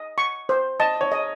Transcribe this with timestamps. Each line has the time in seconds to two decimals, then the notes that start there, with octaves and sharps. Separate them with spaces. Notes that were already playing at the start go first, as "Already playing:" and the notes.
Already playing: D#5
0.18 C#6
0.49 C5
0.80 D#5 A5
1.01 C#5
1.12 D#5